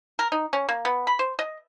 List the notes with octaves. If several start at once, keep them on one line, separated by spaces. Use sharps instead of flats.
A#4
D#4
C#4
A#3
B3
B5
C5
D#5